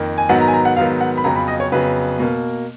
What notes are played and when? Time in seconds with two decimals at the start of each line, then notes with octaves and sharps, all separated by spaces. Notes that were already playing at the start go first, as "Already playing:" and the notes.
Already playing: F2 D#3 A#3
0.18 G#5
0.29 G#2 D#3 F#3 B3 F#5
0.41 A#5
0.48 G#5
0.53 A#5
0.65 F#5
0.77 G#2 D#3 F#3 B3 F5
1.01 F#5
1.17 B5
1.24 F2 C#3 F#3 B3 A#5
1.36 B5
1.48 D#5
1.60 C#5
1.72 F2 C#3 F#3 B3 B4
2.19 B2 A#3